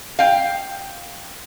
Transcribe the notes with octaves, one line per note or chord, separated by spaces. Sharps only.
F5 G5